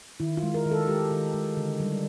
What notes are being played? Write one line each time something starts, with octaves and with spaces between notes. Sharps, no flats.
D#3 E4
F4
G#3
A#4
D#3
A4
G#3 G4
D#3
G#3
D3
G3